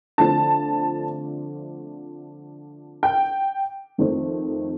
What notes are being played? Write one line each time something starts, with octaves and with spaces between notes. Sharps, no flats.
D3 F3 A3 C4 A5
G5
F2 D#3 A3 C4